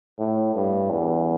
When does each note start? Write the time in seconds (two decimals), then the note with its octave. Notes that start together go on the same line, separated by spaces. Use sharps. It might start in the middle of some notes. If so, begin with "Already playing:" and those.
0.19 A2
0.55 G2
0.90 E2